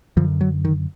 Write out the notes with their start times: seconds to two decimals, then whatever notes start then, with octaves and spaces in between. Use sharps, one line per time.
0.17 F#2 D3 F3
0.41 F#3
0.65 D#3